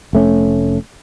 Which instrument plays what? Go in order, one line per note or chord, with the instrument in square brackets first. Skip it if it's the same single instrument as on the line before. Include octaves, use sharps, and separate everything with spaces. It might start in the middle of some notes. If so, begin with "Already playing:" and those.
[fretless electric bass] F1 A3 C#4